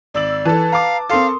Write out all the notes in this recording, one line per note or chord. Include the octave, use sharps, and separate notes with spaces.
G#1 D5 E6 F#7
E3 A4 B4 A5 A6
F5 A#5 D6
C4 A4 A#4 F5 C6 D#6